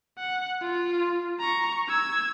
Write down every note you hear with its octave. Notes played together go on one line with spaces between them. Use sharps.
F#5
F4
A#5 C#6
E6 G#6